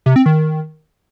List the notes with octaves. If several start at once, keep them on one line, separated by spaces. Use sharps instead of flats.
C3
C4
D#3